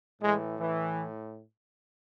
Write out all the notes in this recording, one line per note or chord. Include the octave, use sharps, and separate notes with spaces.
A2 E3 G#3
E3